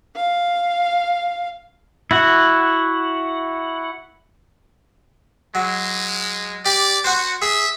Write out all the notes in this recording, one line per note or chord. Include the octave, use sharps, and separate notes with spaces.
F5
E4 F#4 F#5
F#3 G#3
G4 D5
F#4 C5 F#5 C#6
G#4 E5